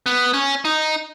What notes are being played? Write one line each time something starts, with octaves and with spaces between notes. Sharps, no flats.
B3
C#4
D#4